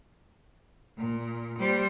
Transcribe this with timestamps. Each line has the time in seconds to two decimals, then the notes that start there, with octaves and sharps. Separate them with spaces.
0.98 A#2
1.58 G3 C5